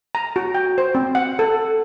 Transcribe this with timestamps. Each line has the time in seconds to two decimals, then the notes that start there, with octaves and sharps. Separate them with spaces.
0.15 A#5
0.36 F#4
0.55 G5
0.78 C5
0.95 C4
1.15 F#5
1.39 A4